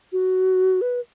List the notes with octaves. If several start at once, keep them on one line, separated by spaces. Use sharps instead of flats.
F#4
B4